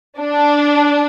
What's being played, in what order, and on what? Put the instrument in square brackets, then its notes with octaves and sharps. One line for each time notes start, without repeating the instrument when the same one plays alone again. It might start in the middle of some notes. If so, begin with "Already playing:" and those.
[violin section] D4